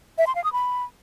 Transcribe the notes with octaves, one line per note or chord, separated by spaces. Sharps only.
E5
C6
F5
D#6
B5